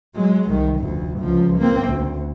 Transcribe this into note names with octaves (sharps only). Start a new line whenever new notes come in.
F#3 G#3
C2 D#3
F1 D2
C#2 F3
A#3 C4
D2